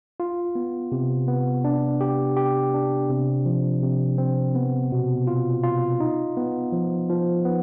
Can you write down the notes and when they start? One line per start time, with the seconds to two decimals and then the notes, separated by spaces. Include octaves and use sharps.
0.20 F4
0.55 B3
0.92 C3
1.28 B3
1.64 D4
2.01 G4
2.37 G4
2.74 D4
3.09 C3
3.46 F3
3.82 C3
4.18 C4
4.55 B3
4.92 B2
5.27 F4
5.63 F4
6.00 D#4
6.37 B3
6.72 F3
7.10 F3
7.45 B3